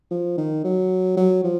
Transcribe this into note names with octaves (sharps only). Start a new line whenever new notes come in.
F3
D#3
F#3
F#3
F3